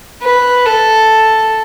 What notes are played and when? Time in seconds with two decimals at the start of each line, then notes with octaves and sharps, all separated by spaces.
0.23 B4
0.66 A4